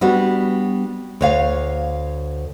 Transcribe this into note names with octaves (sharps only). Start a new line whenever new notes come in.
G3 B3 D4 F#4
D2 C#5 F5